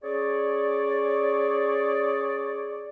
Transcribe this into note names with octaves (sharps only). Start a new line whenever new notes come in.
C#4 G#4 C#5 D5